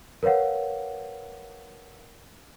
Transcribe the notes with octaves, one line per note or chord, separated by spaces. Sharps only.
A#4 B4 C#5 F5 F#5